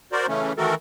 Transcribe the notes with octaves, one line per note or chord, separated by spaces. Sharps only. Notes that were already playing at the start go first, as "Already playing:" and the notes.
F#4 A#4 C5 D5
C#3 E3 A3 C#4
D#3 E3 A3 F#4 A4 A#4